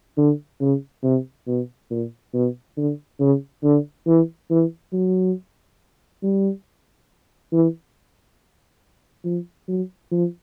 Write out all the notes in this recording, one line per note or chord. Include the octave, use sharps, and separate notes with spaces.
D3
C#3
C3
B2
A#2
B2
D3
C#3
D3
E3
E3
F#3
G3
E3
F3
F#3
F3